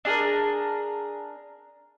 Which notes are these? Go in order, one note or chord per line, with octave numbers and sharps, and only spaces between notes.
D4 G#4 A#4